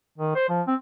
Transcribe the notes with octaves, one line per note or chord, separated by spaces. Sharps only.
D#3
C5
F3
C4